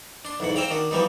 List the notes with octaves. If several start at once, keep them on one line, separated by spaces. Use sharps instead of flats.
D4 C6
B1 E2 G#2 F#5
C4 C5 E5 F5 G5 A#5
D#3 D4 F#4
E3 F3 G3 B3 D#4